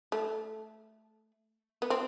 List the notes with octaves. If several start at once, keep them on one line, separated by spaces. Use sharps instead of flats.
A3
B3
C4